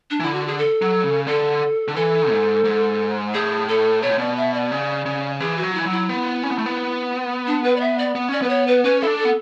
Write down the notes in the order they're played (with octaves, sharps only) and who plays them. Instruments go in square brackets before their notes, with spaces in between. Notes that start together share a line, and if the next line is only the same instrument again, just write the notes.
[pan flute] D4
[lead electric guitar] D3 E3 [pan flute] E4
[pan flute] F#4
G#4
A4
[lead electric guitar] F#3
C#3
[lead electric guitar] D3 [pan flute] A4
[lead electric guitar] D3
[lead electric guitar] E3 [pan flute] A4
[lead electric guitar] G#2
G#2
[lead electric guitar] A2 [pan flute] G#4
[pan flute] A4
[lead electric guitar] B2 [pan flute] C#5
[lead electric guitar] A2
[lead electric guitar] B2 [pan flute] D5
[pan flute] E5
D5
[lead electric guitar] C#3
C#3
[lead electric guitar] E3 [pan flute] G#4
[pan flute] F#4
[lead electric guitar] F#3
[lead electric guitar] E3 [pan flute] E4
[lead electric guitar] F#3
[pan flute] E4
[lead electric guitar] B3
C#4
B3
A3
B3
[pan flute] D4
B4
D5
E5
D5
[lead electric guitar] B3
[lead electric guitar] C#4 [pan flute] D5
[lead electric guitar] B3 [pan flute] B4
[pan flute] C#5
B4
[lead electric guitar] C#4 [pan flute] B4
[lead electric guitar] E4 [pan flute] A4
[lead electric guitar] D4
[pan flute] A4
[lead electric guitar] B3